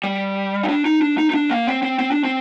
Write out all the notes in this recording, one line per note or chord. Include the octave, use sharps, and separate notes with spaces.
G3
D#4
D4
D#4
D4
D#4
D#4
D4
A#3
C4
C4
C4
D4
C4